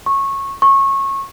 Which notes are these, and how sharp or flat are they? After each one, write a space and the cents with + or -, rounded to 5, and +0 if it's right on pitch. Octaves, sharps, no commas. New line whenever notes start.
C#6 -20
C#6 -25